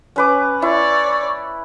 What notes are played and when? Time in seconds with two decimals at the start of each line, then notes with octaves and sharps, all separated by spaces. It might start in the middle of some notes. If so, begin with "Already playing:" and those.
0.16 C#4 B4 D6
0.62 E4 C#5 D5